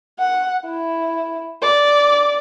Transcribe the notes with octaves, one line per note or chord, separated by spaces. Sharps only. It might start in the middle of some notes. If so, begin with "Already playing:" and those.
F#5
E4
D5